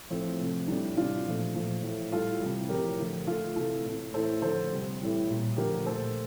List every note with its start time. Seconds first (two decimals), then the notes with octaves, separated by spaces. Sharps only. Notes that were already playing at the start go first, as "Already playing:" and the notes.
0.10 A2 F3 A3 C4
0.40 C3 F3 A3
0.68 A2 G3 D4
0.97 C3 E3 G3 D4 F4
1.26 A#2 F3 A3
1.55 A#2 F3 A3
1.83 A2 F3 A3
2.12 A2 G3 F4 A4
2.40 C3 E3 G3
2.69 A2 F3 A3 G4 A#4
2.99 D3 F3 A3
3.27 D3 A3 F4 A4
3.56 C3 E3 A3 F4 A4
3.85 A2 E3 A3
4.14 A2 E3 A3 A4 C5
4.42 D3 F3 A3 A4 C5
4.71 C3 G3
5.00 A2 E3 G3
5.28 A#2 G3
5.57 D3 F3 A3 G4 A#4
5.86 A#2 A3 A4 C5